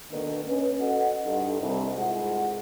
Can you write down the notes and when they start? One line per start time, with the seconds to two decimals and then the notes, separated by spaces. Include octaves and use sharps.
0.12 B2 D3 D#3 A#3 D4 B4
0.48 C#4 B4
0.80 F#4 A4 B4 D#5 F#5
1.25 G2 D#4 A4 D#5
1.61 C2
1.96 C2 G#2 G#3 F4 F#5